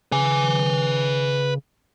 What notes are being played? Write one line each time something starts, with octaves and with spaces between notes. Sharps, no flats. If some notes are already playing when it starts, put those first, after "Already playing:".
C#3 B4 G#5